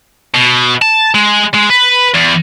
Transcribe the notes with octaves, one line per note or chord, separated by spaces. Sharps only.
B2
A5
G#3
G#3
B4
E2